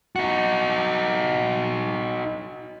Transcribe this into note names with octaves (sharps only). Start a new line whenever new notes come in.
D#4 F#4